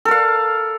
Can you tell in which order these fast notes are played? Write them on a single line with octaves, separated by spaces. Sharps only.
A4 A#4 F5